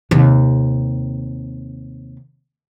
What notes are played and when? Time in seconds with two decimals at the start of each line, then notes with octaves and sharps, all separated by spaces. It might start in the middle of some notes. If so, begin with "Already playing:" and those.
0.11 D#2 C3